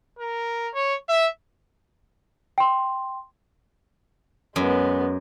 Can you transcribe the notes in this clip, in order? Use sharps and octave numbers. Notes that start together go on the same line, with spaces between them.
A#4
C#5
E5
G5 C6
F#2 G#3 B3